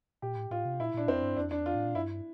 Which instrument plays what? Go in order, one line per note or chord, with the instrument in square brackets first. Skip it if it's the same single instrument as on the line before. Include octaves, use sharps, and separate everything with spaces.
[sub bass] A#2 [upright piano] G4
[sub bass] A2
[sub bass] A2 [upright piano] F4
[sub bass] C3
[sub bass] A#2 [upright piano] E4
[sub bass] A#2 [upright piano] D4
[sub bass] F2 [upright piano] C4
[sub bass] G2
[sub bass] F2 [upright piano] D4
[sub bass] E2 [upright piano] D4
[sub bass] F2 [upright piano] F4
[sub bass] A2
A#2
[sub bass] G2 [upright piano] E4